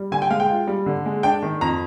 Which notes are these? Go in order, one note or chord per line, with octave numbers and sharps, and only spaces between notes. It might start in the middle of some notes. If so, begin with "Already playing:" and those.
Already playing: G3
D3 G#5
G5
G#3 F5
G5
F4
G3
D3
G#3
D4 G5
D#3
F2 A#5